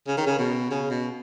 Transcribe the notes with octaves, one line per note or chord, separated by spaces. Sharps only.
C#3
D#3
C#3
B2
C#3
B2